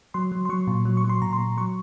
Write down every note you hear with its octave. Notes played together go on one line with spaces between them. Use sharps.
F#3 C6
F#3
C6
F#3 C#6
A#2
F#3
C#6
F#3
C6
A#2 A#5
C6
A#2
F#3 C#6